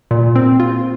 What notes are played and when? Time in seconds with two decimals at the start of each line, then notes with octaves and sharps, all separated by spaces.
0.11 A#2
0.36 C4
0.60 F4